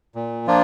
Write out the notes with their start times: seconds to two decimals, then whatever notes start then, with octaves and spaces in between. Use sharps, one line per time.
0.15 A#2
0.47 F3 A#3 D4 F4